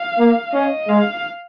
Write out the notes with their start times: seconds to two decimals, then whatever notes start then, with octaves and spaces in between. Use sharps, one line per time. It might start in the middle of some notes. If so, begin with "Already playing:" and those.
Already playing: F5
0.18 A#3
0.53 C#4 D#5
0.88 G#3 F5